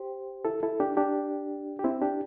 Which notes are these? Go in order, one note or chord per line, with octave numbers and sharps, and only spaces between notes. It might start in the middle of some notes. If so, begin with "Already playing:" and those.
Already playing: G4 C5
E4 A4
E4 A4
D4 G4
D4 G4
G4
C4 E4
D4 G4